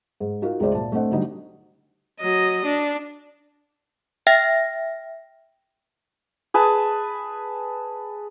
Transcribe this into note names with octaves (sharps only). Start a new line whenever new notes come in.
G#2
D#4 F4 F#4 A#4 F5
C#2 C#3 G#3 C5 D5 E5
A#2 A5
A3 C4 D4 C5 D#5 F#5
D3 F#3 G3 D4 D#4
F#3 D#5
D4
E5 G5 F6 A#6
G#4 B4 G#5 A5